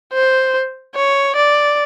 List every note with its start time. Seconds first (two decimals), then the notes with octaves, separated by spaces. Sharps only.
0.13 C5
0.96 C#5
1.36 D5